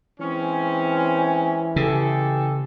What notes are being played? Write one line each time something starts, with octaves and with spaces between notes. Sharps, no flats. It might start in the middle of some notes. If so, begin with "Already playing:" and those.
E3 G#3 C4 C#4
C#3 G#3 G4 A4